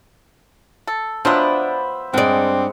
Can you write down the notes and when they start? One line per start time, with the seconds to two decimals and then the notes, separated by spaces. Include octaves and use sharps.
0.87 A4
1.25 F3 F#3 B3 D4 C5 E5 B5
2.14 G2 G#3 C4 D5 F#5